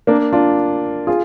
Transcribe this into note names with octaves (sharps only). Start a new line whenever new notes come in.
A#3 D4
D4 F4
F4 G#4